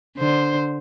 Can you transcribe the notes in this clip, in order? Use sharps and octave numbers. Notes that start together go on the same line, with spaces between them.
D3 C5